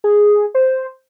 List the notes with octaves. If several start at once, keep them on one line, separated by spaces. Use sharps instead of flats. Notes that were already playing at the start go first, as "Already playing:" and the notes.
G#4
C5